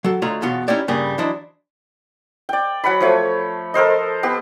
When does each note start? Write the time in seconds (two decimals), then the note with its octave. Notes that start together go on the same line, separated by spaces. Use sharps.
0.04 F#3 A4
0.22 D2 A3 F4 C#5 D#5 A#5
0.42 E2 B2 B3 F4 C#5
0.68 C#4 D#4 E4 G4 C#5 D5
0.88 G2 C#3 G3 A#3 G#4
1.18 E3 F#3 D4 E4 C5 D#5
2.49 D5 G5
2.84 F#3 F#5 G#5 B5
3.00 F3 A3 C#5
3.74 A4 A#4 C5 D#5
4.23 B3 G4